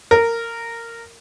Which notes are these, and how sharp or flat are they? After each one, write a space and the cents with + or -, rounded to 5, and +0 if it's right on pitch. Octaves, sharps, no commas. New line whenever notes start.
A#4 -15